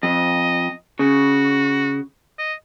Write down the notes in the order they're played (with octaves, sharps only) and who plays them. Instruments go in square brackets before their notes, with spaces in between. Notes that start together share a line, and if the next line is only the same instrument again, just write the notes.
[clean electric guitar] F2 [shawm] D#5
[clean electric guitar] C#3 [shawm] F#4
[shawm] D#5